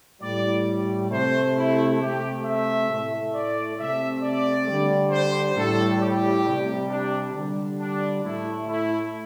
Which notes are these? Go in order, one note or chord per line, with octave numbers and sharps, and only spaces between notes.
A2 G3 D5
C3 A3 C5
E4
C3 A3 G4
E5
A2 A3
D5
C3 A3 E5
D5
D3 G3
C5
A2 G3 A4
G4
C3 G3
D4
D3 G3
D4
A2 A3 E4
E4